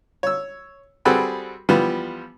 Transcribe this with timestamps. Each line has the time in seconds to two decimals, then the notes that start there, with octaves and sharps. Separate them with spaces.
0.23 C#5 E6
1.05 G3 C4 F#4 G#4 A4 B4
1.69 E3 F3 G3 B3